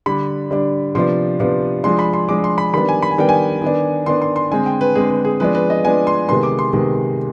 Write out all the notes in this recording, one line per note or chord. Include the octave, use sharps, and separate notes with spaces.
D3 G3 D4 B5
D3 G3 D4
C3 F3 B3 D4 C6
C3 F3 B3 D4
F3 G#3 D4 C6
B5
C6
F3 G#3 D4 D6
C6
B5
D#3 G3 B3 D4 B5
G#5
B5
G#5
D#3 G3 B3 D4 G5
G#5
D#3 B3 D4
D#3 B3 D4 C6
C6
C6
D3 G#3 C4 G#5
G5
B4
D3 G#3 C4 G#4
B4
G#4
F3 G#3 B3 D4 B4
B4
D#5
F3 G#3 B3 D4 G#5
C6
C3 D#3 G#3 B3 C6
D6
C6
C3 D#3 G#3 B3